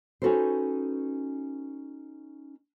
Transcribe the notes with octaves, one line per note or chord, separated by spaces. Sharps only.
C#4 D#4 F#4 A4 B4 C5